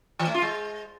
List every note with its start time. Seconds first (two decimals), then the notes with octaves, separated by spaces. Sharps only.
0.19 E3
0.27 A3
0.34 F4
0.42 G#3